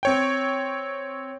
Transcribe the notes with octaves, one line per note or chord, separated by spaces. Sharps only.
C4 C#5 G5